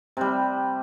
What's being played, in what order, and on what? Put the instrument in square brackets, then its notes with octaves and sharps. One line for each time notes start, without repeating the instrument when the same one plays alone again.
[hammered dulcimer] C3 G3